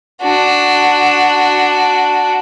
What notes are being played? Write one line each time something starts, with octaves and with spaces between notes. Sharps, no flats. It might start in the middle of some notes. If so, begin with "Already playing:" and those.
D4 F#4